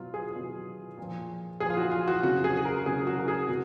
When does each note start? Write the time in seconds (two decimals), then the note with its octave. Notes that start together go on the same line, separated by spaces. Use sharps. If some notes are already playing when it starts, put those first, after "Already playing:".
Already playing: B2 F#3 F4
0.14 G#4
0.36 B2 F#3
0.97 A#2 F3
1.60 A#2 F3 G#4
1.70 F4
1.77 F#4
1.92 F4
2.08 F#4
2.23 C#3 F#3 F#4
2.44 G#4
2.57 G#4
2.65 A#4
2.86 C#3 F#3 G#4
3.07 F#4
3.19 A#4
3.28 G#4
3.49 C#3 F#4